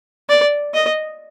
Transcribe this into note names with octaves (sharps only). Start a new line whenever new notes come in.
D5
D#5